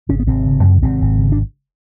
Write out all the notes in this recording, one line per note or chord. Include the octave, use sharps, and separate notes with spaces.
G#1 C#3 C#4
B3
G#1 C3 C4
C#3
F#2
G#1 C3 C4
G#1
C#3
D4